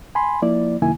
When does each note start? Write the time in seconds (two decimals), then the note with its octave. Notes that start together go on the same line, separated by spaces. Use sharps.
0.15 G#5 B5 C6
0.42 F3 A#3 E4 D5
0.82 F#2 C3 D#3 A#3 E4 G#5